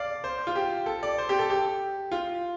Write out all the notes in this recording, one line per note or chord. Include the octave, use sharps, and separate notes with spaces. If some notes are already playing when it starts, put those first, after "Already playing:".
Already playing: D5 F5
C5
F4
G4
A4
D5
C5
G4
A4
G4
F4